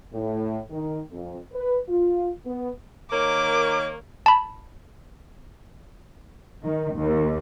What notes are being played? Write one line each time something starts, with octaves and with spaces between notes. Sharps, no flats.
A2
D#3
F2
B4
F4
B3
D#3 A#3 A#4 C#5 D6
A5 B5
D#3
D#2